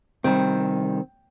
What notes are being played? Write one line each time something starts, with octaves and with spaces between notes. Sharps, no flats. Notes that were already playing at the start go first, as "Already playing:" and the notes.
C3 D#3 G3 C4